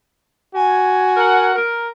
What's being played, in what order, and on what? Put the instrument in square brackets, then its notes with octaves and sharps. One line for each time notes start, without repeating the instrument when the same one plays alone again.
[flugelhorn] F#4 [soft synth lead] G#5
[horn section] A#4 F#5
A#4